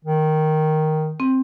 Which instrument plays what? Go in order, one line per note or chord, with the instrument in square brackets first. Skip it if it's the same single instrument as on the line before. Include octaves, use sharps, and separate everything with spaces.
[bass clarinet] D#3
[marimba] C4